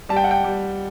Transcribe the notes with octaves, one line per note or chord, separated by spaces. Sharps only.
G3 A5
G5
F#5
G5
G3